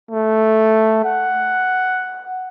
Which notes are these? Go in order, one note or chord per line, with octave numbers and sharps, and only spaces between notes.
A3
F#5